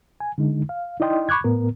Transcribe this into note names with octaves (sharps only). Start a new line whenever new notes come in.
G#5
D3 G#3 D#4
F5
D#4 E4 D5 D#5 G5 C6
B5 C#6 D6 F#6 G#6
A2 B3 A#4